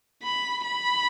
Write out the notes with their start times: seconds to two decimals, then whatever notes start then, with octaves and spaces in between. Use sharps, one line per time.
0.23 B5
0.65 B5